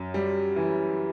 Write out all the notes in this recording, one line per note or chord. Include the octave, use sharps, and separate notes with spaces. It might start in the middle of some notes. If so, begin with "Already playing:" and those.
Already playing: F#2
G3
E3